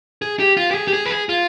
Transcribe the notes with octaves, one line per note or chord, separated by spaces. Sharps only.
G#4
G4
F4
G4
G#4
G4
G#4
B4
G#4
F4